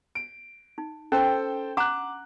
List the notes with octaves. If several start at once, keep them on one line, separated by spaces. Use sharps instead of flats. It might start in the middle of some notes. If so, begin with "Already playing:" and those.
D7
D#4
C#4 A4 C5 G5
D4 F#5 A#5 D6 F#6